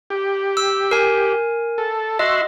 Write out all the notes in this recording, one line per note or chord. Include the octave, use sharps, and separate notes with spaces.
G4
E6
A#4 G#5
A4
F#4 D#5 E5 C6